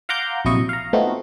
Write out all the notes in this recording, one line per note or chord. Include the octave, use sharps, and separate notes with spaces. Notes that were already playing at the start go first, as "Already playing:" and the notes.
F5 F#5 A#5 C6 D6 G6
A#1 C3 F#3 E4 D#5 C#6
F5 A#5
A3 B3 C4 D#4 F4 F#4